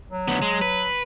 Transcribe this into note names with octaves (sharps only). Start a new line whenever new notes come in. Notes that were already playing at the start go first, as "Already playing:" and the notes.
F#3
D2 B3
G#3
B4